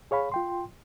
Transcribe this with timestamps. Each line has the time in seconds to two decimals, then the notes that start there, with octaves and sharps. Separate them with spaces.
0.11 G#4 C#5 F5 B5
0.32 F4 G5 C6